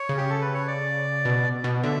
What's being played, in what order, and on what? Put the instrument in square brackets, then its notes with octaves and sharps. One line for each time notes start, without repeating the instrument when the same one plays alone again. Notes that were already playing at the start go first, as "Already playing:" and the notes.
Already playing: [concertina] C#5
[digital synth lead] C#3
[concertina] G4
A4
B4
C#5
D5
[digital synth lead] B2
B2
[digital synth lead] D3 [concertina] E5